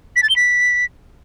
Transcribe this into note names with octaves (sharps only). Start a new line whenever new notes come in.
B6
A6
G7
B6